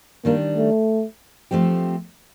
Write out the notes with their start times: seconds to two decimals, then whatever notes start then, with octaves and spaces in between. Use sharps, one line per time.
0.25 D#3 G3 A#3 D4
0.56 A3
1.51 F3 A3 C4 G4